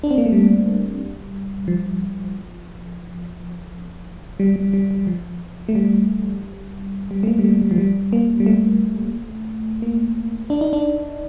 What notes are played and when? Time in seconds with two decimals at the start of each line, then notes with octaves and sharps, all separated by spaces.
0.04 D4
0.11 C4
0.18 A#3
0.26 A3
0.32 G3
1.68 F3
4.40 G3
4.56 G3
4.73 G3
4.91 G3
5.07 F3
5.69 A3
5.75 G3
7.11 G3
7.23 A3
7.27 A#3
7.39 G3
7.44 A3
7.61 G3
7.71 F3
7.78 G3
8.13 A#3
8.40 G3
8.46 A3
9.82 A#3
10.50 D4
10.61 D#4
10.73 D4